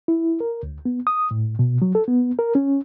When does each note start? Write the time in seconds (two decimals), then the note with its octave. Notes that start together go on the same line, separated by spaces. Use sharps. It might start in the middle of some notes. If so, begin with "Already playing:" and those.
0.08 E4
0.40 A#4
0.63 D2
0.85 B3
1.07 D#6
1.31 A2
1.59 B2
1.82 F#3
1.95 A4
2.08 B3
2.39 A#4
2.55 C#4